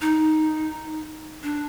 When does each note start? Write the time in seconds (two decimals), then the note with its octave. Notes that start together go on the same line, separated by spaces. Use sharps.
0.01 D#4
1.43 D4